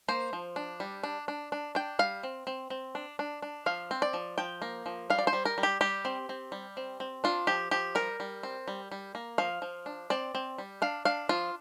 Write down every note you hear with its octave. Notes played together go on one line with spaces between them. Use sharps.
A#3 C5
F3
D4
G3
D4
D4
D4
D4 G5
G3 F5
C4
C4
C4
D4
D4
D4
F3 F5
C4
D5
F3
F3 G5
A#3
F3
G3 F5
D5
C5
G3
A#4
G3
G4
G3 G4
C4
C4
G3
C4
C4
D4 F4
F3 G4
F3 G4
G3 A#4
G3
C4
G3
G3
A#3
F3 F5
F3
D4
C4 D5
C4
G3
D4 F5
D4 F5
F3 F4